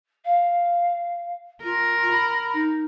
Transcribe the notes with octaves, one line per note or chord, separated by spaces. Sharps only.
F5
F4 A#4
B5
D#4